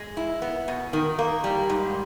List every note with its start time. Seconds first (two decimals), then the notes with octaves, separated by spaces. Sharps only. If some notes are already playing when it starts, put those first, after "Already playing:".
Already playing: G#3
0.17 E4
0.42 B3
0.68 B2
0.93 D#3
1.19 A#3
1.44 G3
1.69 G#2